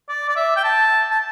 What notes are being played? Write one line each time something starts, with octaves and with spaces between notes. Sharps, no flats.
D5
D5
E5
G5
A5
A5